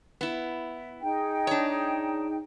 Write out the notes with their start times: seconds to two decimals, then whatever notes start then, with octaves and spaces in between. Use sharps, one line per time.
0.21 B3 E4
1.02 D#4 G#4 G5
1.47 D4 C#5